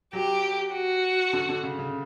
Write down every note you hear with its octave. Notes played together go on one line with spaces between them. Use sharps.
F#3 G4
F#4
D3
D3
C#3
C#3